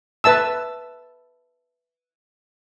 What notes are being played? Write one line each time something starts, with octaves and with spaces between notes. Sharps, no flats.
B4 E5 A5 E6